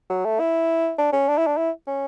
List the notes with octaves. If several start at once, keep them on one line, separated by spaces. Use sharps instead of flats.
F#3
A3
E4
D4
C#4
D4
E4
D4
E4
C#4